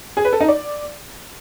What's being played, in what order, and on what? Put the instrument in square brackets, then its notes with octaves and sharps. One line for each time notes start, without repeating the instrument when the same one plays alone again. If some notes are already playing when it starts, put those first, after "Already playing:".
[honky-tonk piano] G#4
B4
A4
D#4
D5